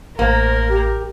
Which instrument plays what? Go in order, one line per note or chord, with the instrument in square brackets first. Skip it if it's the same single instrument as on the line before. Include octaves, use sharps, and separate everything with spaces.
[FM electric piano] A1 A2 A#5 [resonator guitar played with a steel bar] A#3 [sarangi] A#4 [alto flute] C5
[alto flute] G4